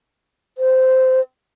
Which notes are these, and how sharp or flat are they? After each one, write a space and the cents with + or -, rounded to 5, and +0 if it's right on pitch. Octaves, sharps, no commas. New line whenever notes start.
C5 -15